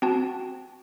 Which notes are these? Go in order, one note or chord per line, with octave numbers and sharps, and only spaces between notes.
C4 F#4 A5